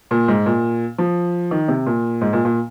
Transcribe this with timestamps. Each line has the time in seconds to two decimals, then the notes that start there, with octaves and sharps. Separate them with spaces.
0.11 A#2
0.28 G#2
0.46 A#2
0.98 F3
1.51 D#3
1.68 C3
1.86 A#2
2.21 G#2
2.33 A#2
2.45 A#2